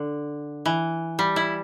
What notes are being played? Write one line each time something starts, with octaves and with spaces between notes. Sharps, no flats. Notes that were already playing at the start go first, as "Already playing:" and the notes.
Already playing: D3
E3
G3
E4